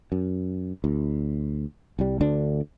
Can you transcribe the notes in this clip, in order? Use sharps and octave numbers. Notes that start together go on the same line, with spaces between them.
F#2
D2
C2 G3
D2 D3 D4